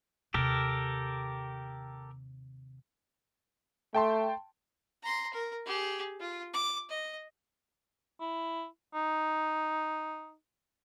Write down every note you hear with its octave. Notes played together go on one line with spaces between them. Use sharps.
D#2 C3 G4 A4 A#4
A3 G5 A5 C6
A#5 C6
A#4
G4 G#4
F4
D6
D#5
E4
D#4